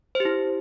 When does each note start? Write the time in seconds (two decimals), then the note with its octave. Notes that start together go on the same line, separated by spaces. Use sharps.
0.15 C5
0.20 G4
0.25 E4